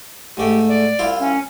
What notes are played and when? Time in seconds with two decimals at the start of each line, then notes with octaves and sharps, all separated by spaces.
0.37 G#2 A3 G4
0.68 D5
0.99 C2 E4 F4
1.20 C#4